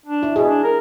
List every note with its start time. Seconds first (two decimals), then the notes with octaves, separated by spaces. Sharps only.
0.06 D4
0.23 E4
0.36 B2 G#4
0.48 D4
0.64 A#4